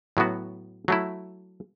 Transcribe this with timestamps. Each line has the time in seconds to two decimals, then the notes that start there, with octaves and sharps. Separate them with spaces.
0.17 A2 F#3 B3 F#4
0.88 F#3 A3 E4